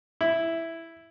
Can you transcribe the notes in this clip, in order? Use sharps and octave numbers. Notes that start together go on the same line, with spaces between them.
E4